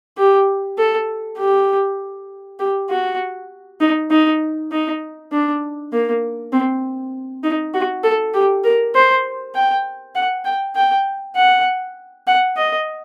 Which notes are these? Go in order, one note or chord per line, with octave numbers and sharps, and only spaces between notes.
G4
A4
G4
G4
F#4
D#4
D#4
D#4
D4
A#3
C4
D#4
F#4
A4
G4
A#4
C5
G5
F#5
G5
G5
F#5
F#5
D#5